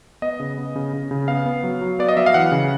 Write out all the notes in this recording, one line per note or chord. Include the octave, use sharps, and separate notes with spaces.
B3 D#5
C#3
B3
C#3
C#3
C#3
B3 F5
B3
F#3
F#3
B3 D5
D#5
F#3 E5
F5
E3 F#5
C#3